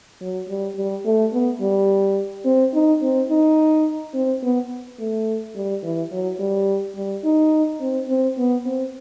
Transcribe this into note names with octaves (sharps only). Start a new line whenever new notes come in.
F#3
G3
G3
A3
B3
G3
C4
D#4
C4
D#4
C4
B3
A3
G3
E3
F#3
G3
G3
D#4
C4
C4
B3
C4